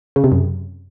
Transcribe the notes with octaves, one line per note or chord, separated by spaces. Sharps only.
C#3
C3
F#2